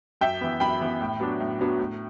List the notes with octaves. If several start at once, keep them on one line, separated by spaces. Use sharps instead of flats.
F#2 E5 G5
E3 B3
F#2 G5 B5
E3 B3
A2
F#3 B3 D4
A2
F#3 B3 D4
A2